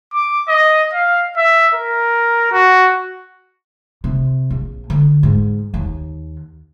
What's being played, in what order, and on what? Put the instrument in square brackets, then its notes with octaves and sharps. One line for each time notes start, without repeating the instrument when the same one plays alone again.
[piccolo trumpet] D6
D#5
F5
E5
A#4
F#4
[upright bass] C3
A#1
D3
G#2
D#2